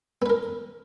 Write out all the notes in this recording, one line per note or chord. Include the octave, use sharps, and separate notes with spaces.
B3 A#4 B4